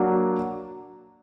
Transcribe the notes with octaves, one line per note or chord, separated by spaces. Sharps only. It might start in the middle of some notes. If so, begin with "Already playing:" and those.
Already playing: F#3 A#3 D4 F#4